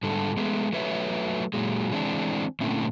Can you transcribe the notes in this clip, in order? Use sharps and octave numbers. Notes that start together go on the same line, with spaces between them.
G#2 D3 G3 A4
G#3 A3 B3
F#3 A3 B4 C#5 E5
A#2 F#3 G#3
E3 G#3 C4 D4
A#2 D3 A3 C4 C#4 E4